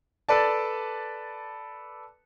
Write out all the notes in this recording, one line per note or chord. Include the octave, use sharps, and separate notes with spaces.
A4 B4 D5 A5